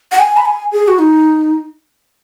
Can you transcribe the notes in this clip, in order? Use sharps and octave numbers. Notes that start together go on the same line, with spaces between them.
F#5
G#5
B5
G#5
G#4
F#4
D#4